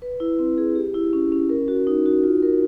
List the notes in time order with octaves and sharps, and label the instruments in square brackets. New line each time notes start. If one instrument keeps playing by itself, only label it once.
[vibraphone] B4
E4
C4
G#4
G4
E4
C#4
C#4
A#4
F#4
D#4
F#4
F4
A#4